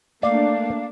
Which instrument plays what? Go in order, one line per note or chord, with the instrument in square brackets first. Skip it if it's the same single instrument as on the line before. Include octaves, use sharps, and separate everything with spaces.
[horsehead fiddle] A3 [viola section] A#3 D4 [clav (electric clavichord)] D5 [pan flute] F5